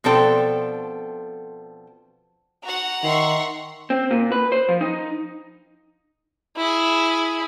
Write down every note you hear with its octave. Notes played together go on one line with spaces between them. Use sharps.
B2 F3 C4 D4 A4 G5
F#4 F#5 A#5
D#3 E5 C6 C#6
C4
A#2
B4
C5
F3
D#4
E4 G#4